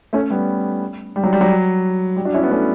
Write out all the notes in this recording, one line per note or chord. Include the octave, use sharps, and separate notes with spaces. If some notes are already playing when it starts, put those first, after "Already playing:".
A3 C#4
G3 B3
G3
F#3
G3
F#3
G3
D4 F#4
C#4 E4
B3 D4
A3 C#4